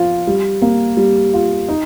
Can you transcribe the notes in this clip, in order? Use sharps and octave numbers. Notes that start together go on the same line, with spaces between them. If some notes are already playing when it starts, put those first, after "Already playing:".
Already playing: F3 F4
G3
A#3
G3
F4
D#4